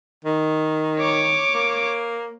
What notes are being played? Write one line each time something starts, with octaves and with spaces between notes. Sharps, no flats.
D#3
C#5 D6
A#3